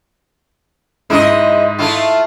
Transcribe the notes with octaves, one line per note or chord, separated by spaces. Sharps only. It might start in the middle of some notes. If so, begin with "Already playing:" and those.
G#2 E4 D#5 C6
A3 E4 F4